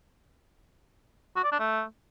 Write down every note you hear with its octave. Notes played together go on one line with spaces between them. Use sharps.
F#4
D5
D4
A3